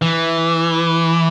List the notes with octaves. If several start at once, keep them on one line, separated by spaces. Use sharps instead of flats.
E3